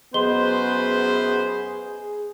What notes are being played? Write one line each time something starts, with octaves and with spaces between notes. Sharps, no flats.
F#2 B3 G#4 B4 C5 D#5 C6 G7